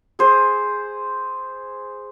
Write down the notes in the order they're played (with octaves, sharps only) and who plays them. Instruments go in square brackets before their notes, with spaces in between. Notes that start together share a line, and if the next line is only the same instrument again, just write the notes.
[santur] G#4 C5